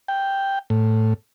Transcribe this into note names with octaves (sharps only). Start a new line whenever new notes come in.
G5
A2